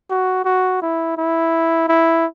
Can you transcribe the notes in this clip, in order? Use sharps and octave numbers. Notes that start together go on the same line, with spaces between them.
F#4
F#4
E4
E4
E4